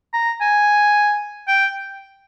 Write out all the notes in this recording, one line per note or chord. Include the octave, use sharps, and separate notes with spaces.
A#5
G#5
G5